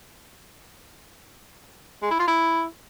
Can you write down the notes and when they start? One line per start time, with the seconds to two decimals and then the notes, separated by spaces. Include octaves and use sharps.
2.03 G#3
2.11 E4
2.19 F4
2.28 E4